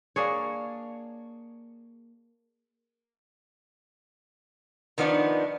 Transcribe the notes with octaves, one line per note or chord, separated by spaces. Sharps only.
A#3 D4 G#4 C#5
D#3 F3 B3 D4 D#4